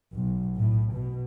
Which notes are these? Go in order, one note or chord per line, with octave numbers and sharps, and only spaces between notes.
B1
A2
B2